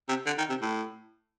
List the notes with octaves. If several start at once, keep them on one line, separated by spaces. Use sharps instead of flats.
C3
D3
D#3
C3
A2